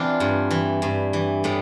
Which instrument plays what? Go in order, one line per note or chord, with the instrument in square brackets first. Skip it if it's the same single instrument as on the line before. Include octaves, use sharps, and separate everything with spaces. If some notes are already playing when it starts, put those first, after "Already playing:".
Already playing: [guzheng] E3 C4 D4 F4
G2
E3
G2
E3
A2 G3 B3